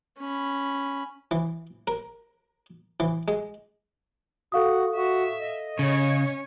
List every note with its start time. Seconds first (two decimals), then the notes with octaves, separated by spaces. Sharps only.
0.18 C#4 B5
1.31 E3
1.87 A#4
3.00 E3
3.28 G#3
4.52 F#4 A4 F5 D#6
4.96 F#4 E5
5.39 D#5
5.79 C#3 C#4 C#5